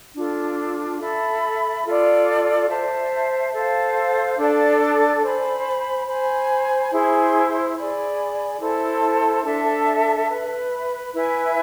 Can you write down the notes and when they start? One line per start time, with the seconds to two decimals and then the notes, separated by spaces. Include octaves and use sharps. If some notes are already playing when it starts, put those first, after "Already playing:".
0.15 D4 F4 A4
1.00 A4 E5 B5
1.84 F4 A4 D5
2.69 C5 E5 A5
3.53 A4 C5 F5
4.38 D4 A4 D5 A5
5.22 C5 G#5 B5
6.06 C5 G#5 B5
6.91 E4 G#4 C5
7.76 G#4 D5 G#5 B5
8.60 E4 A4 C5
9.44 D4 A4 E5
10.29 B4 E5 B5
11.13 E4 B4 E5 G#5